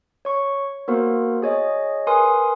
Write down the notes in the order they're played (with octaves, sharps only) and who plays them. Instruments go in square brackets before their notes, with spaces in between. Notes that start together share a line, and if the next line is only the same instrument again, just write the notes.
[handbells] C#5 C#6
A#3 B3 F#4 A#4 C5
G#4 C#5 D#5
A#4 B4 G#5 C6 D#6